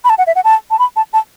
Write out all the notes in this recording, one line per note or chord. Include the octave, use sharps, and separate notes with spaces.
B5
A5
F#5
E5
F#5
A5
A5
B5
A5
A5